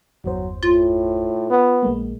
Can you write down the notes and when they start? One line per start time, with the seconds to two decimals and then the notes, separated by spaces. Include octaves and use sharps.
0.24 G1 E2 F#3 C5
0.63 A2 F4
1.50 B3
1.83 A#1 G#3 A#3